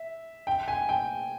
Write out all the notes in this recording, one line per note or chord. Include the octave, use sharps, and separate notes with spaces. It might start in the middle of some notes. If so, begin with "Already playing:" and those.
Already playing: E5
G5
G#5
G5